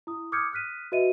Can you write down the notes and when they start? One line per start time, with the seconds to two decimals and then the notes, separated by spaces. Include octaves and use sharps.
0.07 E4 D#6
0.32 D6 D#6 F6 G6 G#6 C#7
0.52 D#6 F6 F#6 B6 D#7
0.92 F#4 B4 D#5 E5 D#7